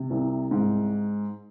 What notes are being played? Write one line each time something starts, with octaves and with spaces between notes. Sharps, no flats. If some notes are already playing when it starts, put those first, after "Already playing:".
Already playing: C3
C2
G#2